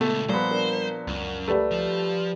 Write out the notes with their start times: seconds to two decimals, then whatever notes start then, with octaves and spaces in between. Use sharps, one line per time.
0.01 C#2 A#2 A3 B3
0.29 A#2 F3 G3 B3 C5
0.51 D4 A#4
1.07 C#2 F#2
1.48 G3 A3 B4
1.71 F3